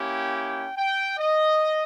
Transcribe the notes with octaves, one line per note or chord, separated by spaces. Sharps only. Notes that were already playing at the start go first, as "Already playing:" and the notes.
Already playing: A#3 C#4 E4 G4 G5
G5
G5
D#5